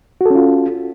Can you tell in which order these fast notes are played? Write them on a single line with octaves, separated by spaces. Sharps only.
F#4 A4 C#4 F4